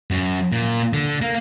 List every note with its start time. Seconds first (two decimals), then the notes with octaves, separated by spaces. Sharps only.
0.11 F#2
0.52 A#2
0.93 D3
1.22 A#3